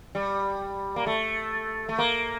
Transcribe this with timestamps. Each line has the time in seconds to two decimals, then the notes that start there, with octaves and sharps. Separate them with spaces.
0.15 G3
0.96 A#3
1.07 A3
1.89 A3
1.99 A#3